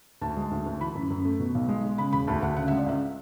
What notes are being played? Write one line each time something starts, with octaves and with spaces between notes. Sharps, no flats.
D2 A5
G#3
D2
D2
E3 B5
F#2
F#2
A3
B2
B1
G#3
G#3
C#3 B5
E1 B5
D2 A5
D2 F#5
C#3 F#5
G#3 E5
D5
C#2 E5